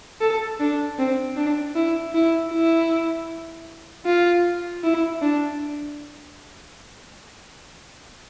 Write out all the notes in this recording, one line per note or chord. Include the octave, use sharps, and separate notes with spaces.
A4
D4
C4
D4
E4
E4
E4
F4
E4
D4